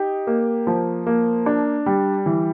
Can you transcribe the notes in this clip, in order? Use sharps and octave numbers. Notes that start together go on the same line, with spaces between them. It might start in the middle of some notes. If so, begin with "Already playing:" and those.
Already playing: D#4 G4
A#3
F3
A#3
D4
G3
E3